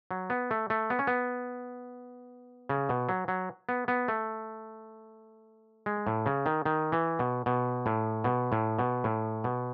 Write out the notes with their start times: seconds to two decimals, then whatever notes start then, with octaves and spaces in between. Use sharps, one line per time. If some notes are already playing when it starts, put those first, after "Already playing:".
0.11 F#3
0.30 B3
0.51 A3
0.70 A3
0.90 B3
0.99 C#4
1.07 B3
2.69 C#3
2.89 B2
3.09 F#3
3.28 F#3
3.69 B3
3.88 B3
4.08 A3
5.86 G#3
6.07 A2
6.26 C#3
6.46 D#3
6.65 D#3
6.92 E3
7.19 B2
7.46 B2
7.86 A2
8.24 B2
8.52 A2
8.79 B2
9.04 A2
9.44 B2